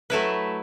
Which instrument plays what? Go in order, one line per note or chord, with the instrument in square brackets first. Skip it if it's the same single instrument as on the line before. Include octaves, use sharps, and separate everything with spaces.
[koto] F#3 A3 E4 B4